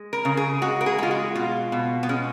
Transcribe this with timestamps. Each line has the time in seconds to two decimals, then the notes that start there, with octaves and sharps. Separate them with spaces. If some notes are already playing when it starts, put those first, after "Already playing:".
Already playing: G#3
0.13 A#4
0.25 C#3
0.37 G#4
0.62 G#3 F#4
0.81 A#4
0.86 G#4
0.98 G#3 F4
1.11 F#4
1.35 B2 F4
1.72 B2
2.03 B3
2.09 G#3 C#4